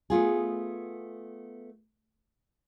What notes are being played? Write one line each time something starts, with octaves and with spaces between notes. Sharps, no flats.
A3 B3 F4 G#4